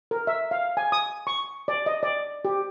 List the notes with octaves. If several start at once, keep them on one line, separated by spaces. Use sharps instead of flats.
A#4
E5
F5
G#5
D#6
C#6
D5
D#5
D5
G4